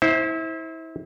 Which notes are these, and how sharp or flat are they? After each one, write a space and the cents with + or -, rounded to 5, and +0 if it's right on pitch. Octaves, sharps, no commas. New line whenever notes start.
E4 -30 C5 +10